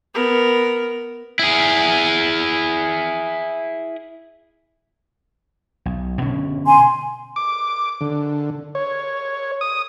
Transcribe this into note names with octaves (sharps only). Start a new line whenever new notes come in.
B3 A#4
E4 G#4
B1
B2 D3 C#4
G#5 C6
D6
D3
C#5
D#6